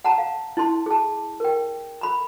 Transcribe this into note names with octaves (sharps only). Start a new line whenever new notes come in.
F#5 A5 A#5
F5
E4 A5 C6
G#4 A5
A#4 G5
A#5 B5